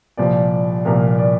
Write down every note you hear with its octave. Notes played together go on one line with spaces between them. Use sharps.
C2 A#2 F3 D5
C2 A#2 F3 A#4
D5